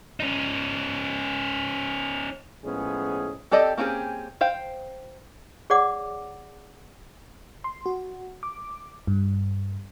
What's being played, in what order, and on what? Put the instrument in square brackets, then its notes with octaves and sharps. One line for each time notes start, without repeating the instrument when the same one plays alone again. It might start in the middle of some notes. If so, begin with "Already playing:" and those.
[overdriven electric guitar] C#4 D#4
[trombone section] A2 F3 G#3 B3 C#4 G#4
[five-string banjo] C4 G4 A4 D5 D#5
A#3 C4 C#4 G4 G#4
C5 F5 G5
[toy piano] G#4 C#5 D5 F#5 D6
[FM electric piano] C6
F#4
D6
G2